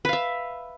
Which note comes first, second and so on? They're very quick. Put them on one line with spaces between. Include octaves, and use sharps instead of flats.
B4 F5 E5